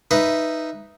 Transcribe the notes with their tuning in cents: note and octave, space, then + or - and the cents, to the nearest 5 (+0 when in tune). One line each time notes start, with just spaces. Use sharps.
D#4 +0 B4 +0 E5 +10